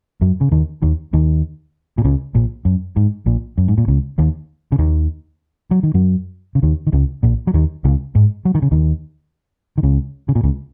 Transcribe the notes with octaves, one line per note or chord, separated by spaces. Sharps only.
F#2 F#3
C#3
D#2 D#3
D#2 D#3
D#2 D#3
A#2
C#2 C#3
A#1 A#2
F#2
G#2
A#1 A#2
F#2
G#2
A#2
C#2 C#3
D#2 D#3
C#3
D#2 D#3
F#3
D#3
F#2 F#3
C#3
D#2 D#3
D#3
C#2 C#3
A#1 A#2
F#3
D#2 D#3
C#2 C#3
G#2
F#3
D#3
C#3
D#2 D#3
D#3
C#2 C#3
C#3
A#2
C#2 C#3